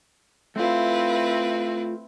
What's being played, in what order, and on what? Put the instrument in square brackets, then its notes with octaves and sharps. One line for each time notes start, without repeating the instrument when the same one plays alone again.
[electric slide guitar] A3 F4 [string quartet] C4 E4 B4